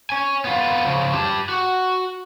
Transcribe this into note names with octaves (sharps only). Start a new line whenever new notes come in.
C#5 G#5
B3 F4
C#3 F3
G4 A5
F#4